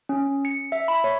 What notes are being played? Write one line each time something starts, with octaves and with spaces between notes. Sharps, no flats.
C#4
C#7
E5
B5
C#5